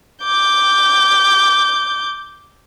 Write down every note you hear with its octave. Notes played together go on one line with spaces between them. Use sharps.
D6 G6